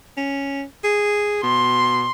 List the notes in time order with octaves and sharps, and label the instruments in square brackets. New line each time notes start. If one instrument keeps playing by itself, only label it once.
[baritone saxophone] C#4
G#4
[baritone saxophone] B2 [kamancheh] C6